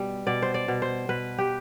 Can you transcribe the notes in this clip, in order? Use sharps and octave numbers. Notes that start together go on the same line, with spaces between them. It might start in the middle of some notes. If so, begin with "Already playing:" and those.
Already playing: B2 G3
B2 D5
C5
D5
B2
C5
B2 B4
G4